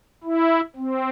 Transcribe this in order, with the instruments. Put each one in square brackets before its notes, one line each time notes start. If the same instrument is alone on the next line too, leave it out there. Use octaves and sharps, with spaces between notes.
[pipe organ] E4
C4